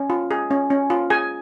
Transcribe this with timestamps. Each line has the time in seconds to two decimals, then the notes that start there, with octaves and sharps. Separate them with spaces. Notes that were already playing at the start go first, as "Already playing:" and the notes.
Already playing: C#4
0.10 F4
0.31 G#4
0.51 C#4
0.70 C#4
0.90 F4
1.10 G#4 G#5